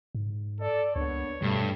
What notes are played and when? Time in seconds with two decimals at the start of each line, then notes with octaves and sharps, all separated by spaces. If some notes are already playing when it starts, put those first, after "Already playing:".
0.15 G#2
0.61 A4 D5
0.96 C#2 A#3 B3 D4 C#5
1.42 G2 B2 A3